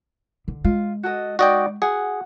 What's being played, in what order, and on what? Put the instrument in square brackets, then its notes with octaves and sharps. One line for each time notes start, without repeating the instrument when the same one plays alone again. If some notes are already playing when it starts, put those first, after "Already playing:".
[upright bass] D3
[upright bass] G#3 [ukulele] F4
[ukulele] F#4 A4 D#5
[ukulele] D#4 D5 [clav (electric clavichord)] F#4 D#5 G5
[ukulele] F#4 F#5 [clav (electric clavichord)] G#4